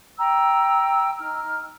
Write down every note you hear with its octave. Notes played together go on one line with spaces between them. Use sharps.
G5 A#5 E6
D#4 F6